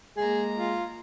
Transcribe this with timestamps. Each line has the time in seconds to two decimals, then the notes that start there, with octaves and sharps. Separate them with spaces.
0.17 G#3 A#3 G#4 A#5
0.57 F4